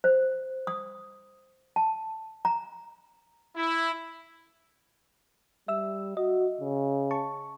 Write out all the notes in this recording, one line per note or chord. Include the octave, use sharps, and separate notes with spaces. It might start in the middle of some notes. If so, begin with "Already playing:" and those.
C5
D#6
A5
A#5
E4
G3 E5 E6
F#4 D#5
C#3
A5 C#6